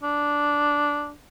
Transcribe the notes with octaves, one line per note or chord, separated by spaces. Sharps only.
D4